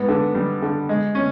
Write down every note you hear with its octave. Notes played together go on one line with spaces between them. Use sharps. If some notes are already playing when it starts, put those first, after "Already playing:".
Already playing: G#2 B3
D3
G3
D3
G#3
C#4